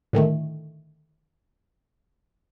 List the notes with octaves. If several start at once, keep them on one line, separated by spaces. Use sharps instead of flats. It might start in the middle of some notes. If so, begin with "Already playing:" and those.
A2 D3 D#3 A3